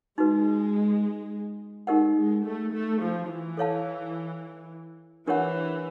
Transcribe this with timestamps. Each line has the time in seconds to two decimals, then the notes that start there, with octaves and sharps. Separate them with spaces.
0.18 G#3 D#4 F#4 B4
1.87 G#3 D#4 G4 A#4 D#5 F#5
2.16 G#3
2.44 A3
2.73 A3
3.00 F3
3.29 E3
3.57 A4 C#5 F5 A5
5.27 E3 D4 G4 A#4 C#5 F#5